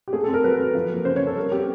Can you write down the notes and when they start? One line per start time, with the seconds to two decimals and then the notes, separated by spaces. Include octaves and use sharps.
0.08 G4
0.13 A3 G#4
0.24 A4
0.28 C4
0.34 A#4
0.44 F#3 B4
0.60 F#3
0.75 F3
0.91 A#3
1.05 C#3 C5
1.16 C#5
1.21 C#4
1.27 A4
1.36 G3 A#4
1.52 B3 G4